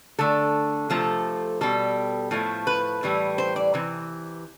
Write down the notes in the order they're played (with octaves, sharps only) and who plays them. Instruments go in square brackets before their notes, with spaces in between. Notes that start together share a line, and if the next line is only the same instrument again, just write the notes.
[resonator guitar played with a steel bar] D3 A3 A4
C3 F3 A3 A4
B2 G3 A4
A2 F3 A3
B4
A2 E3 G3
C5
D5
C3 E3